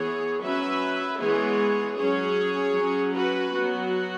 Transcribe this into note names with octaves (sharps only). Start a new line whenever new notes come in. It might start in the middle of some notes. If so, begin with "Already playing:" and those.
Already playing: E3 B3 G#4 C#5
F#3 C#4 B4 E5
E3 G#3 B3 G#4 C#5
F#3 C#4 G#4 C#5
F#3 C#4
F#4 B4
F#3 B3 F#4